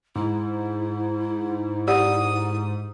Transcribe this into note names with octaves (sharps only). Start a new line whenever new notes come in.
G#2 E4
G4 D5 F#5 D#6